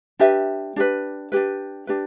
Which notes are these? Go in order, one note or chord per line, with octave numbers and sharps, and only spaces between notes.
D4 G4 B4 E5
D4 G4 B4
D4 G4 B4
D4 G4 B4